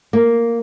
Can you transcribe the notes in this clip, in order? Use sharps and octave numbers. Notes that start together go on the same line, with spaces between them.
A#3